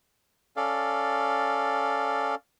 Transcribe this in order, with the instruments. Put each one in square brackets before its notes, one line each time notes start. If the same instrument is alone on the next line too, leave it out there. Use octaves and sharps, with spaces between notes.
[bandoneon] C#4 A4 D5 F5